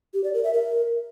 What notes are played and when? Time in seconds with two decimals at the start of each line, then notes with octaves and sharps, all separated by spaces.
0.14 G4
0.24 D5
0.34 A#4
0.44 E5
0.54 A#4